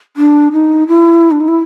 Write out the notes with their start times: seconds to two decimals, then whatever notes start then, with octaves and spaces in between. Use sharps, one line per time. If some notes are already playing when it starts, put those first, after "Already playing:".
0.17 D4
0.52 D#4
0.88 E4
1.31 D4
1.40 D#4
1.48 E4